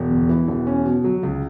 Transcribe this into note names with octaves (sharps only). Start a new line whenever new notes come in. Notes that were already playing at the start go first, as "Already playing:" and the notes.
Already playing: E1
E2
E3
E1
C#4
B2
F#3
C#2